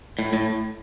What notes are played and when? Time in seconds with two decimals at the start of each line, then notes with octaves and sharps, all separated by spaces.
0.19 A2
0.33 A2